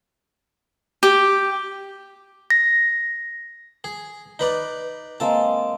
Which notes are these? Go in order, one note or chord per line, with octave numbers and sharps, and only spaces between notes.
G4
A#6
G#4
D#4 B4 D5
G#3 A#3 C4 A5